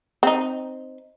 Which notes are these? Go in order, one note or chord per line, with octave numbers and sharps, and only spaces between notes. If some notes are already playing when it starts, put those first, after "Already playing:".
C4 D#4